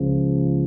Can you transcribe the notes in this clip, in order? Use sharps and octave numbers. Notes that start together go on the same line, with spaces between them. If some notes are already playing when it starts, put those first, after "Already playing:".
Already playing: C#2 C#3 F3